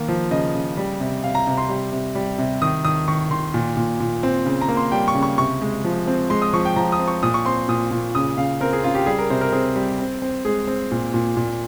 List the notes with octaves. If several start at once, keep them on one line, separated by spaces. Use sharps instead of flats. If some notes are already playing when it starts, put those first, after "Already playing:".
Already playing: D#3 A#3
F3
C#3 D#5
C#3
G3
C3
C3 F5
A#5
C3
C6
G3
C3
G3
C3
D#3 D#6
D#3 D#6
D#3 C#6
D#3 C6
A#2
A#2
A#2
C4
C#3
A#5
A#3
C6
G3 G5
C#6
C#3
C#6
C3 C#6
G#3
F3
C4
G#3 C6
D#6
F3 C#6
G5
F3 A#5
D#6
C4
C#6
A#2 D#6
C#6
C4 C6
A#2 D#6
A#2
C#3 D#6
C#3 F5
C4 A#4
G#4
C#3 F4
G4
G3 G#4
A#4
C3 C5
A#4
C4 G#4
G3
C4
C4
G#3 G#4
C4
A#2
A#2
A#2